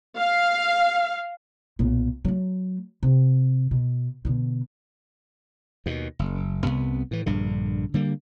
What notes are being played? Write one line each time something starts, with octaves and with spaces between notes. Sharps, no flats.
F5
B1 A#2
F#3 A3
C3
B2
B2 D3
D#2 B2
F#1
C2 F#2 C3 B3
A2 E3
A#1 G2 D3
D3 G3 A#3